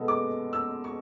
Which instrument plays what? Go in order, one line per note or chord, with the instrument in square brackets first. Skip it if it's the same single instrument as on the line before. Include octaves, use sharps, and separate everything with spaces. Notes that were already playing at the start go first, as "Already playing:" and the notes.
Already playing: [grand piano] B2 G#3 B3 F#4 A4
[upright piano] D6
E6
C#6